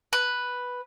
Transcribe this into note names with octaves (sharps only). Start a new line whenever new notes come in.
B4